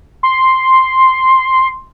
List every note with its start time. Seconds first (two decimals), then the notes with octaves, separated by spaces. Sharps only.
0.23 C6